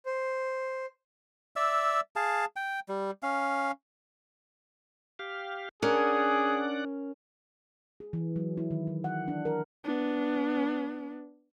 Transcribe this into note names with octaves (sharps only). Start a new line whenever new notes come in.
C5
D5 E5 E6
G#4 F5 A5
G5
G3
C#4 F5
G4 F5
C#4 D4 G#4 A#4 D5 F#5
G#4
E3
F#3
E4
D#3
D#3
F#5
D4
A#4
B3 D4